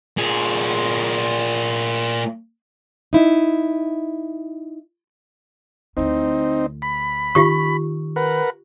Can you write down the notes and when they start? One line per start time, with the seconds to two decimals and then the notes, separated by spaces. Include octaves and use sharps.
0.17 A#2 G#4
3.13 D#4 E4
5.97 D2 C4 D#4 E4
6.82 B5
7.35 D#3 F4 G4 C#6
8.16 A#4 B4 F#5